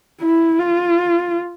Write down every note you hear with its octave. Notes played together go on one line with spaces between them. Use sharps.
E4
F4